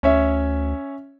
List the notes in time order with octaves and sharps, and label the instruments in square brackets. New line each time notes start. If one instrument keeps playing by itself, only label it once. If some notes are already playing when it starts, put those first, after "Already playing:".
[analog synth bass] D2 [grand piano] C#4 C#5 E5